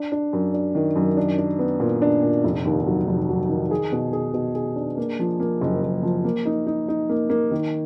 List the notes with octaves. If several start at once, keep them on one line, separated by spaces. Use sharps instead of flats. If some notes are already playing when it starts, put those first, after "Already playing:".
Already playing: D4
D4
F#2
D4
D#3
F#2
D4
D4
B3
A#2
D4
A#2
F1
D#2
F#3
F1
F#3
D#3
G#4
B2
G#4
B2
G#4
D4
A#3
F3
A#3
F#1
F#1
F3
A#3
D#4
D#4
D#4
A#3
A#3
D#3